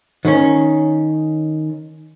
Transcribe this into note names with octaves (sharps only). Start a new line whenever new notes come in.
D#3 C#4